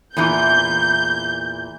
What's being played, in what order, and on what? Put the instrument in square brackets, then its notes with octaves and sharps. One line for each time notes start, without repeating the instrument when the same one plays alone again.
[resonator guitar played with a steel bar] E2 A#2 E3 [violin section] G6